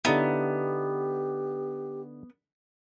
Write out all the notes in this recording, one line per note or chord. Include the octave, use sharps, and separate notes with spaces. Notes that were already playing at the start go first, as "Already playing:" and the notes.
D3 B3 D#4 E4 G4